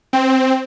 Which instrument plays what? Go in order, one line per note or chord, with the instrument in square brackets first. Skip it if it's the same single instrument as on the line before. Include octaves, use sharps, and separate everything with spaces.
[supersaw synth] C4